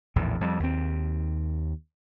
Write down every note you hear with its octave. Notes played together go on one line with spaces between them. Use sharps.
A#1 E2 A2
F2 G3
D#2 C4